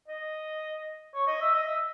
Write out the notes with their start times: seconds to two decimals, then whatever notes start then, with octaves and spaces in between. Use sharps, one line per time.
0.08 D#5
1.15 C#5
1.27 D#5
1.41 E5
1.54 D#5
1.67 E5